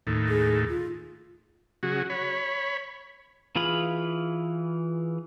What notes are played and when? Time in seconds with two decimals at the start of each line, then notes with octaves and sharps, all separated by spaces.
0.07 D#2 A2
0.28 G#4
0.69 F4
1.83 C#3 F#3 F#4 G#4
2.10 C#5 B5
3.56 E3 F4 G#4 F5 B5